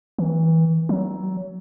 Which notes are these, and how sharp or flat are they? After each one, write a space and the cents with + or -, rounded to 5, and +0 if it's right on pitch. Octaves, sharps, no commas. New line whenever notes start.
E3 -25
F#3 +25